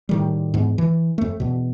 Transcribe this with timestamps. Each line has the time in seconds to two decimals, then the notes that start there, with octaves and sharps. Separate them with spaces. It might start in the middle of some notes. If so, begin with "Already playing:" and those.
0.09 A2 D#3 G3
0.54 E2 G#2
0.78 E3
1.18 F2 A3
1.40 E2 B2